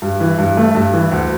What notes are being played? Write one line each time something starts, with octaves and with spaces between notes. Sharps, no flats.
G2
E3
G2
A3
G2
E3
D2